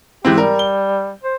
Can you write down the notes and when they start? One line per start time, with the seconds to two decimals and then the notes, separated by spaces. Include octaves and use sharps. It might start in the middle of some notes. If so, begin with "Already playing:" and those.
0.25 G#2 E3 C4 G4
0.38 G3 A#4
0.59 G7
1.23 C5